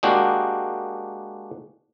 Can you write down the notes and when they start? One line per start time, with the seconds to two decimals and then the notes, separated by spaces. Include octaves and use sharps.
0.03 G#3 A#3 D4 F#4 G4